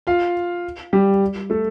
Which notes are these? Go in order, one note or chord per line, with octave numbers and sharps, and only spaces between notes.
F4 F5
G3 G4
A3 A4